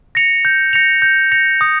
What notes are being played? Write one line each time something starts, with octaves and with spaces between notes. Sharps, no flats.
A#6 C#7 F7
G6
A#6 C#7 F7
G6
A#6 C#7 F7
D#6